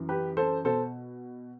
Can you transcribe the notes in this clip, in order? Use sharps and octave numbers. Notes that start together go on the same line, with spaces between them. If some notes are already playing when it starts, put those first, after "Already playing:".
Already playing: F#2 E3
G4 B4
A4 C5
B2 A4 C5